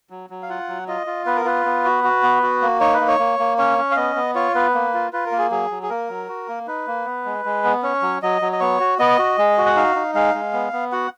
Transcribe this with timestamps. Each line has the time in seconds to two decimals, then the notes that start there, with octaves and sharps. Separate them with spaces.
0.10 F#3
0.30 F#3
0.42 F5
0.49 F4 F#5
0.69 F#3
0.88 F4 D#5
1.07 F4
1.26 B3 B4
1.36 A#4
1.45 F4 B4
1.66 B3
1.85 F#4
2.04 F#4
2.23 B3
2.43 F#4
2.62 A#3
2.80 D#4 C#5
2.94 B4
3.01 A#3
3.08 C#5
3.19 A#3
3.39 A#3
3.58 C#4 C#5
3.78 C#4
3.91 F5
3.96 B3 D#5
4.16 B3
4.35 F4 C#5
4.55 B3 B4
4.74 A#3
4.94 F4
5.13 F4 B4
5.26 A#4
5.32 A#3
5.38 G#4
5.51 F#3 G#4
5.71 F#3
5.83 G#4
5.90 A#3 A#4
6.09 F#3
6.28 F#4
6.48 A#3
6.67 D#4 B4
6.87 A#3
7.05 B3
7.25 G#3
7.45 G#3
7.64 B3
7.83 C#4 C#5
8.02 F#3
8.22 F#3 D#5
8.42 F#3
8.52 D#5
8.60 B3 C#5
8.80 F#4
8.99 B3 D#5
9.19 F#4
9.38 G#3
9.58 F#4
9.66 F#5
9.76 D#4 F5
9.96 D#4
10.14 G#3 F5
10.34 G#3
10.53 B3
10.73 B3
10.92 F#4 F#5